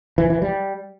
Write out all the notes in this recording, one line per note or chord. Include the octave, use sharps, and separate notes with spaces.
E3
E3
G3